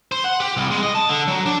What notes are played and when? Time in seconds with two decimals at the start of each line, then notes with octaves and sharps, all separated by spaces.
0.12 C5
0.24 F#5
0.40 G4
0.57 C2
0.71 G#3
0.83 D#5
0.95 A5
1.09 D3
1.28 F#3
1.46 D4